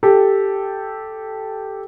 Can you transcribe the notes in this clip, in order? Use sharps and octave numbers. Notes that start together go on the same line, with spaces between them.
G4 A4